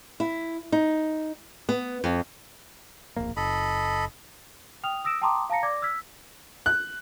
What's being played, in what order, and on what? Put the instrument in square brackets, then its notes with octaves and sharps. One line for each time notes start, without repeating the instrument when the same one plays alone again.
[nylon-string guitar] E4
D#4
B3
F2
[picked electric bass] D1 A#1 A#3
[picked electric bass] F#1 [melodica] A4 D#5 B5
[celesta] G5 D#6 F6 F7
D#6 E6 A#6 D7 E7
G5 A5 A#5 C6 D6 D#6
F5 A5 A#5 A#6 C#7
D5 D6 G#6 A#6
E6 F6 G#6 B6
[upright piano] F#6